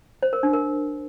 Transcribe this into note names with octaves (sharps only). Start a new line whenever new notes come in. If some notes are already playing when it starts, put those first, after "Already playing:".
C5
A#4
D4
A#4